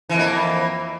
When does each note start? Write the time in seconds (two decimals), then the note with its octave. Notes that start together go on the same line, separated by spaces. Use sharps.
0.09 E3
0.14 F2
0.19 A#3